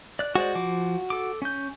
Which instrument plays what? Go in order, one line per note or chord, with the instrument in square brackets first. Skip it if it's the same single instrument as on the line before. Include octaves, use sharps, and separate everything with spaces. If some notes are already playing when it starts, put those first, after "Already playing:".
[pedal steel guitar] D5 F#6
[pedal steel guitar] G#3 C5 D5 [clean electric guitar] F#4
[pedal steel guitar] F3 D6
A4 D6
C#4 G6